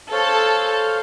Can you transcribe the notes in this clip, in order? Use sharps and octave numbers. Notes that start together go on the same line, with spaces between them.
A4 C5 C#5 F5